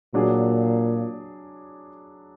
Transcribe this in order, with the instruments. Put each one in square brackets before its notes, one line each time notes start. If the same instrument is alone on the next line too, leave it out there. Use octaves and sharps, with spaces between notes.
[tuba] A#2 [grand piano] F#3 D4 G#4